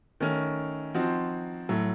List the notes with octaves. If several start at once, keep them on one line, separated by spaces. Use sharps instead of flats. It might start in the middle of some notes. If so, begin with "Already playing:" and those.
D#3 A3 C#4
F3 C4 D#4 F#4
A2 F#3 A3